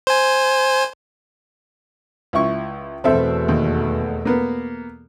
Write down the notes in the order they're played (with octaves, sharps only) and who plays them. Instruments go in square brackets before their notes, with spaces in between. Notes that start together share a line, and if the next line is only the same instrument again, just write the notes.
[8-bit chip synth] C5 G#5
[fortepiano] C#2 E4 C#6
[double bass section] E2 B2 A3 [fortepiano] C4 A4 E5
[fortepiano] D#2
A#3 B3